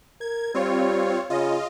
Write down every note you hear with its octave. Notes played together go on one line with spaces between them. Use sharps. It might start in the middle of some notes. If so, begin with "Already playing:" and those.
A#4 G#6
G3 C4 F4 C#5
C#3 F4 D#5